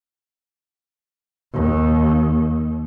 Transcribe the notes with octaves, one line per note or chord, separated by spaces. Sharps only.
D#2